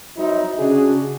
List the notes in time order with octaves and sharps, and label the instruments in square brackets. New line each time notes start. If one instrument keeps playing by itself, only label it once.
[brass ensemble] F#3 C4 D#4 E4
C#3 D4 F#4 G#4